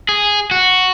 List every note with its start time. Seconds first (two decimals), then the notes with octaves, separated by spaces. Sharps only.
0.09 G#4
0.51 F#4